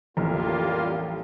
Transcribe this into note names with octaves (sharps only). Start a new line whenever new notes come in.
A1 F2 G3 A#3 F4 F6